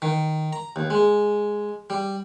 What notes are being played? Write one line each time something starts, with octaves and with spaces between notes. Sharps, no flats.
D#3
A#5
D#2
G#3
G3